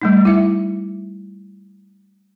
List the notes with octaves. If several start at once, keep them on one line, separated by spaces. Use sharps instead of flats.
G3 A3 D#4
E4 E5